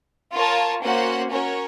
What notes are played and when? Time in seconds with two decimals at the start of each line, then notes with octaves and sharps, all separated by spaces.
0.32 F4 A#4 C#5 A5
0.81 A#3 C#4 F#4 C5 F#5
1.29 C#4 F#4 A#4 C#5